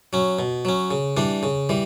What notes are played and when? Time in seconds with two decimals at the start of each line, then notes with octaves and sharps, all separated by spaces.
0.13 F#3 C#4
0.39 B2
0.65 F#3 C#4
0.91 C#3
1.17 E3 G3 D4
1.43 C#3
1.69 E3 G3